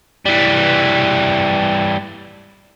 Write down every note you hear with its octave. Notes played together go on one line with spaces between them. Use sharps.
E3 G3